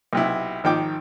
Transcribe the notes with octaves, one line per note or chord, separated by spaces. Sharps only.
B1 C3 E4
G#1 D#3 F3 G5 D6